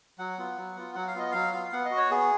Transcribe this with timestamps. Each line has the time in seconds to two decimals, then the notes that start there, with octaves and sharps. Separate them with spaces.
0.19 F#3 F#5
0.38 B3 F4
0.57 F#3
0.76 B3 F4
0.95 F#3 F#5
1.07 F5
1.14 B3 F4 D#5
1.31 F#3 F5
1.53 B3 F4
1.73 B3 F#5
1.85 D#5
1.91 F#4
1.97 C#5
2.11 B3 G#4